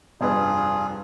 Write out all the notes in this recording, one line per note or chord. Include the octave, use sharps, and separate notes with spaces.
F1 G2 F4 G#4 B4